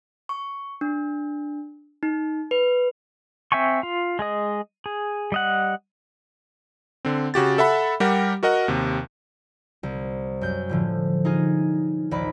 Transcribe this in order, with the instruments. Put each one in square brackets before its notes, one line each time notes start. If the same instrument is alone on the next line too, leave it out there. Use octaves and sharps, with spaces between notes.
[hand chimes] C#6
D4
D#4
B4
[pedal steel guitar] C4 E5 G5 G#5 C#6
F4
G#3 G#4 D#5
G#4
G3 D#5 F#5
[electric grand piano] D3 C4
C#3 F#4 G4 A6
A4 E5 F#5 B5
G3 G4 A#4 F#5
F#4 A#4 D#5 F#5
D#2 C3
[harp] C2
F#2 G6
A2 D3 F3
D#4 F4 G#4
A#1 D#2 D#4 D5 B5